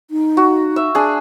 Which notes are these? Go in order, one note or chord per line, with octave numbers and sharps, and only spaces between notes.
D#4
F#4
E5
D4 G#4